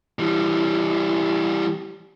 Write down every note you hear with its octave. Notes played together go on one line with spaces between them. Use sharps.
E3 G3